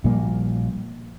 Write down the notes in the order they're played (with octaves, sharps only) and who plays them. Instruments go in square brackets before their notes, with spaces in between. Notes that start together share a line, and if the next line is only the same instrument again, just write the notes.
[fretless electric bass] A#1 A#2 G3 A#3